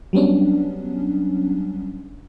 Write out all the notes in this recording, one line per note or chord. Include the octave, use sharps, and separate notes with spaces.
F#3 G3 B3 C#4 D4